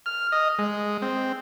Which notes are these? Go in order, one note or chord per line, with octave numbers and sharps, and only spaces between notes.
F6
D#5
G#3
C4